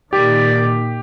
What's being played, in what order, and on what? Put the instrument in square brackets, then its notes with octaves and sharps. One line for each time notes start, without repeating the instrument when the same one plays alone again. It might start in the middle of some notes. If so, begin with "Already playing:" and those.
[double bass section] A#2 D#3 [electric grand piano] G4 [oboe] D5